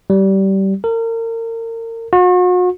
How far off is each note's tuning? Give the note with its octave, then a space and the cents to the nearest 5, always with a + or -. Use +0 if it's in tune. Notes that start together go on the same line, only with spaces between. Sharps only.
G3 -20
A#4 -35
F#4 -40